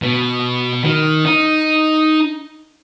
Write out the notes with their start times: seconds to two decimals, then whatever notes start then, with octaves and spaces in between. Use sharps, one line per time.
0.02 B2
0.83 D#3
1.26 D#4